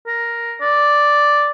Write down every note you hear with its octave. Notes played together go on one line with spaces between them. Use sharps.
A#4
D5